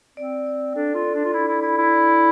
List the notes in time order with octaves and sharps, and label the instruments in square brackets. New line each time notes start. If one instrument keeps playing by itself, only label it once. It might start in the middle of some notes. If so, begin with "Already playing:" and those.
[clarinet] C4 [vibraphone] D5
[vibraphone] D5
[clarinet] D4 [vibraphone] A4
[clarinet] F4
[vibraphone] D5
[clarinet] D4
F4
[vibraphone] D4 [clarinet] E4
[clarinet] E4
[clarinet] E4 [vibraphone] D5
[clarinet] E4
[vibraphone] D5